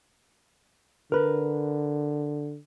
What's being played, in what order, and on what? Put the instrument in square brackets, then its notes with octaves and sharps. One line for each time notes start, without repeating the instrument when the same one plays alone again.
[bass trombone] D3 [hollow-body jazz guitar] A#4 B4